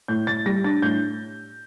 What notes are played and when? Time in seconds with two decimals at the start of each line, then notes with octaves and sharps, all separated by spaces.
0.08 A2 G6
0.27 A2 A6
0.46 G3 A#6
0.64 D4 A6
0.82 A2 G6